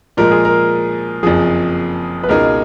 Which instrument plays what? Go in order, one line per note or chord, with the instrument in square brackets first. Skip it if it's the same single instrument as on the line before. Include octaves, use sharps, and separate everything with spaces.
[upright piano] A#2 F3 G#3 [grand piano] A#4
[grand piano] G#4
A#4
[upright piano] F#1 F2 F3 [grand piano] G#4
[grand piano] B4
[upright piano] C#2 B2 G#3 D#4 G#4 [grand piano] A#4